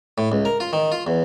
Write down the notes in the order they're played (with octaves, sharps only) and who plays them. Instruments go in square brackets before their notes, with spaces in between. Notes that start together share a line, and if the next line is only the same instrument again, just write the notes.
[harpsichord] A2
C#2
A#4
F4
D#3
F4
E2